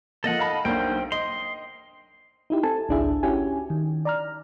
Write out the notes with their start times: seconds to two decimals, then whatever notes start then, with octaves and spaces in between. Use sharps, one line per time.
0.24 F3 A#3 A4 D#5 F#5
0.39 F5 A5 B5
0.65 B1 A#3 D4 C5 G5
1.12 D#5 C6
2.50 D#4 E4 G4
2.63 C4 A4 G#5 A5
2.89 G#1 C#2 D4 E4 G#4 E5
3.23 C#4 E4 F#4 G4 G#5
3.70 D#3
4.05 D5 A#5 F6